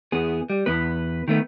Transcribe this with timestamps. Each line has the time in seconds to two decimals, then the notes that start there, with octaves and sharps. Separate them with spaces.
0.12 E2 B3 G#4
0.50 G3
0.66 E2 B3 B4
1.28 D#3 A3 B3